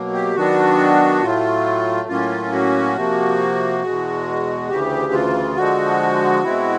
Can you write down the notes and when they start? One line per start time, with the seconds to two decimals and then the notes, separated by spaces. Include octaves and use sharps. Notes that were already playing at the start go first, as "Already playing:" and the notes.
Already playing: B2 F#3 A#3
0.13 G4
0.35 D#3 F#3 B3 D4 F#4
1.22 A2 F#3 A3 F4
2.08 A2 F#3 A#3 C#4 F4
2.52 F#4
2.96 C3 F3 A#3
3.83 E2 B2 G#3
4.69 D2 C#3 E3 G4
5.13 F4
5.56 D3 F3 G#3 F#4
6.44 B2 G#3 C4 E4